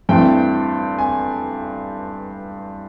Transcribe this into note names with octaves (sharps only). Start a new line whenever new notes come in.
G2 E3 A3 C4 G5
G#5